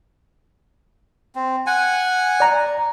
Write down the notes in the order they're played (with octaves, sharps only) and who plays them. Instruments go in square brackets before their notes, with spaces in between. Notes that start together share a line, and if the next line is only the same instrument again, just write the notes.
[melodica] C4
F#5 G#5
[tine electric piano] D5 A#5